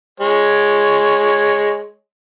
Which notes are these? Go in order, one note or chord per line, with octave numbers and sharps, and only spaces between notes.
G#3 C#5